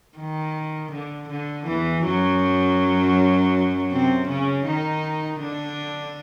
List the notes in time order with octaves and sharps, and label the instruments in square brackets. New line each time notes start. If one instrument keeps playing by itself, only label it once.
[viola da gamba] D#3
D3
D3
E2 E3
F#2 F#3
C3 C4
C#3 C#4
D#3 D#4
D3 D4